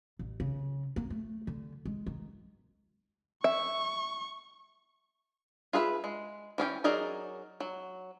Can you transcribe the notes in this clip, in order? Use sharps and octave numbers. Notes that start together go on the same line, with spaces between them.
A1
C#3
A#3
A3
D3
G#3
D#3
E5 C#6
F4 G#4 B4 E5
G#3
E3 C#4 G#4 G5
F#3 D#4 G#4 A#4 D5
F#3